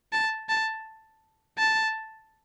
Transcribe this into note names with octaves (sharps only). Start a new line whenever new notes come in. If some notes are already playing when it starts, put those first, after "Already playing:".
A5
A5
A5